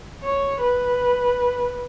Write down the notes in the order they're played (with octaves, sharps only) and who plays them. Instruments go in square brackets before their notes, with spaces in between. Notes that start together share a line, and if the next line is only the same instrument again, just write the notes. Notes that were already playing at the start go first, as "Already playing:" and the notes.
[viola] C#5
B4